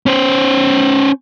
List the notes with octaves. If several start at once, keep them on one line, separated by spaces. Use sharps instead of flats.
C#4 C5